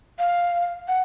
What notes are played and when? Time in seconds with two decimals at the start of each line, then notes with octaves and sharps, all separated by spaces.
0.19 F5
0.88 F#5